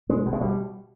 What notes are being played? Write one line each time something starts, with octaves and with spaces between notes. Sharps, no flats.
B2 G#3
B2
G#3
B2 G3